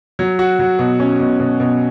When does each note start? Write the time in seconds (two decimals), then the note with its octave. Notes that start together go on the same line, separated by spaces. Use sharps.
0.19 F#3
0.39 F#4
0.59 F#3
0.79 B2
1.00 C#4
1.20 B2
1.40 B2
1.60 B2